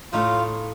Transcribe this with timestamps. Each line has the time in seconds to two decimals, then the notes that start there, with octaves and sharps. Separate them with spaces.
0.12 A2 A3 D#4 F4